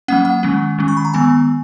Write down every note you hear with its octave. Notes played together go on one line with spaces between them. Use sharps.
F#3 A#3 C#4 F#5
F#5
D#3 G#3 C#4
D#3 G#3 C#4
C#6
B5
A#5
D#3 G#3 B3 G#5